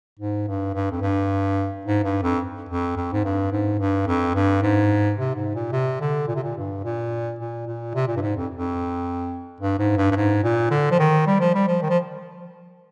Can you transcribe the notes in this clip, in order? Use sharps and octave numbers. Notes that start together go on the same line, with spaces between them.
G#2
G2
G2
F2
G2
G#2
G2
F2
F2
F2
G#2
G2
G#2
G2
F2
G2
G#2
C3
G#2
A#2
C3
D3
A#2
C3
A#2
G2
A#2
A#2
A#2
C3
A#2
G2
G#2
F2
F2
G2
G#2
G2
G2
G#2
A#2
D3
F3
D#3
G3
F3
G3
F3
D#3
F3